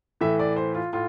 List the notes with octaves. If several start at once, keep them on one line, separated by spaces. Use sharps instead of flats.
A2 E3 A3 E5
D5
C5
F4
A2 F4